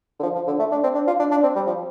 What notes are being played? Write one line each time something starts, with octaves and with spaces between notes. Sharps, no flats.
D3
F3
F3
D3
A3
D4
C4
D4
F4
D4
D4
C4
G3
F3